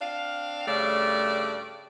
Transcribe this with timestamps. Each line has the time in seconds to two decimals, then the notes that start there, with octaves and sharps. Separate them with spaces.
0.01 C4 D4 F5
0.66 G2 C#3 A3 D5